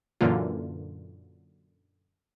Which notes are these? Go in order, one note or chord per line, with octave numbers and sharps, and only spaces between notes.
F#2 A#2 D3 E3 A#3 F4